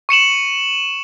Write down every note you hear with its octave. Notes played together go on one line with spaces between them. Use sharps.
C#6 C#7 E7 F#7